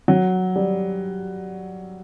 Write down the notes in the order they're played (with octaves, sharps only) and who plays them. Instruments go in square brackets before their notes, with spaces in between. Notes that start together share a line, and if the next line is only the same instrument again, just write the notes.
[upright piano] F#3
G3